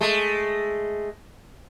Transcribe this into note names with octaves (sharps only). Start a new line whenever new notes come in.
G#3 A3